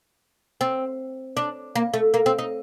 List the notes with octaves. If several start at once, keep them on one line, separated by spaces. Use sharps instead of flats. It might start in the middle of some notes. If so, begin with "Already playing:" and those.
C4
D4
A#3
A3
A#3
C4
D#4